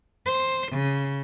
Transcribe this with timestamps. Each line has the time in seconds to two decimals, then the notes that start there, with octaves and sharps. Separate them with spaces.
0.26 C5
0.72 C#3